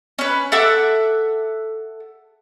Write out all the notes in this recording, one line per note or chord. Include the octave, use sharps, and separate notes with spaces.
C#4 B4
A4 E5 F#5 D6